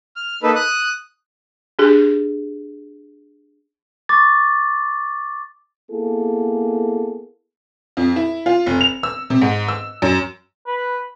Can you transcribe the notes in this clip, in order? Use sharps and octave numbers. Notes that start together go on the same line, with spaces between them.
F6
A#3 D#4 A4 B4
D#6 F#6
D4 G4 G#4
C#6 D6 A6
A#3 B3 E4 G#4 A4
F2
E4
F4
F1
F7
E6
C3
G#2
E6
F#2
B4